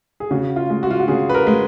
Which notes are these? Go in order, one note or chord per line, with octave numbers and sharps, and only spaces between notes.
G#4
C#3 F#4
F4
G#3
F#4
F4
F#4
C#3 G#4
B4
A#4
G#3